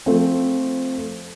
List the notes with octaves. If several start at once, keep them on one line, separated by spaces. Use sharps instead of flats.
F3 A3 C4